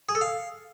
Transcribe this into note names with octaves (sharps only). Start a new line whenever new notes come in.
G#4
A4
F5